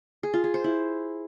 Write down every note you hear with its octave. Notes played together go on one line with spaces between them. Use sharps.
G#4
F4
G#4
C5
E4